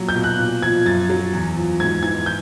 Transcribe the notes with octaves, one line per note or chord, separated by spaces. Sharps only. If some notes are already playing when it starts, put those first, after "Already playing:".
Already playing: A#2 F#3
G6
B2
F#6
A#2
F3 G#6
F#2 A6
F#3
E2
F3
G#2 G#6
E3 G#6
G6